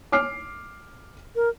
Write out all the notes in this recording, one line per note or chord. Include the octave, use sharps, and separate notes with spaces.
D6 F6 C7
A#4